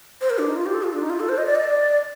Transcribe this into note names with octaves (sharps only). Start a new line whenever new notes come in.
C5
A#4
D4
D#4
F4
G4
A4
F4
D4
D#4
F4
A4
C5
D#5
D5
D#5
D5